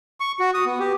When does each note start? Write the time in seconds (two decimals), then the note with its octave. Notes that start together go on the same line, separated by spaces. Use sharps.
0.20 C#6
0.40 F#4
0.54 D#6
0.65 B3
0.80 G4